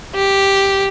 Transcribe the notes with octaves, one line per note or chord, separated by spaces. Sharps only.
G4